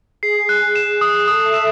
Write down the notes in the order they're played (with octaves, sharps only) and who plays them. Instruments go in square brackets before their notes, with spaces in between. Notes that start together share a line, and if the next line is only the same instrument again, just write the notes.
[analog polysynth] G#4 [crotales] C7
[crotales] F#6
E7
D#6
[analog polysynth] A4 [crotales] D#6
[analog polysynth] E5
[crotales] E7